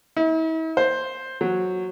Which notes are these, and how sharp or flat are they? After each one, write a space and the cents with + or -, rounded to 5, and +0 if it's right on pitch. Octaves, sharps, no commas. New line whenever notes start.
E4 -45
C5 +5
F#3 -5